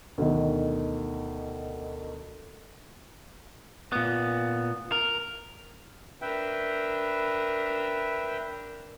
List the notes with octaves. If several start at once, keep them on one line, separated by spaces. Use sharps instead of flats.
D2 B2 D#3
A#2 B3
A#4
D4 A#4 B4 E5 G5